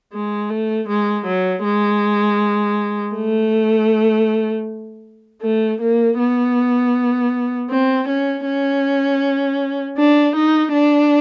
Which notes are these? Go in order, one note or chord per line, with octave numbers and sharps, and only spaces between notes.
G#3
A3
G#3
F#3
G#3
A3
A3
A#3
B3
C4
C#4
C#4
D4
D#4
D4